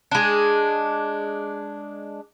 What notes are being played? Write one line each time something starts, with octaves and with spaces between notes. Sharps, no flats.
G#3 D4